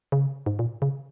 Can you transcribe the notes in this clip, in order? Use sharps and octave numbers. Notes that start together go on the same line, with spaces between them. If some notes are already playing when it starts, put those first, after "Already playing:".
C#3
G#2
A#2
C#3